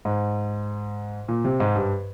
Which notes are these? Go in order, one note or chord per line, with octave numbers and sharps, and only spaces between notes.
G#2
A#2
C3
G#2
G2